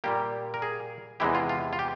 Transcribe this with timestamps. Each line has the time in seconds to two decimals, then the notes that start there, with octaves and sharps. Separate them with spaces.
0.04 A#2 G3 A#3 G4
0.54 A#4
0.62 G#4
1.20 E2 C3 E3 G#3 E4 G4
1.35 F4
1.49 F4
1.73 F4
1.79 G4